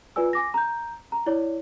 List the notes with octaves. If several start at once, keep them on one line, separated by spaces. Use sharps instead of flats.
F4 B4 D5 G#5 E6
G#5 D6 A#6
A#5 G6
A#5
E4 C#5 D5